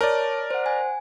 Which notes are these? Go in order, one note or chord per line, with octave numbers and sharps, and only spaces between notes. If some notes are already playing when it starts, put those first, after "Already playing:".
A#4 C#5 D5 A5
C5 F#5
G#5